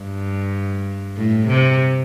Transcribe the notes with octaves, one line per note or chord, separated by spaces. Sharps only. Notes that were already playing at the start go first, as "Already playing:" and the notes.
Already playing: G2
A2
C3